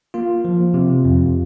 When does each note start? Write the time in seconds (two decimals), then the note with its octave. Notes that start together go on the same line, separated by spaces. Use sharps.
0.14 A#3 F4
0.45 F3
0.74 C3
1.05 F2